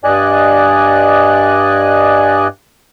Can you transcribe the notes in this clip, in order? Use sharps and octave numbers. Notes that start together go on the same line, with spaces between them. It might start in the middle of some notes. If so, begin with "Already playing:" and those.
G2 D5 D#5 G#5 F#6